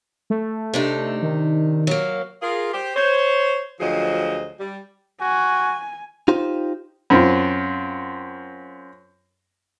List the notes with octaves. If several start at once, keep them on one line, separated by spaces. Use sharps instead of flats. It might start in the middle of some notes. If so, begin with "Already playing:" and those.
A3
C3 D4 D#4
D#3
F#3 A#3
F4 G#4 A#4
G4 C5
C5 C#5
D2 F3 F#3 G#4 C5 D#5
G3
F#4 G#5
D#4 F4 G4 C5
F#2 C4 F4